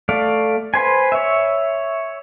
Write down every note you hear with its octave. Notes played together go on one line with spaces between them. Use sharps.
A3 D5 F5
B4 C5 G#5
C#5 E5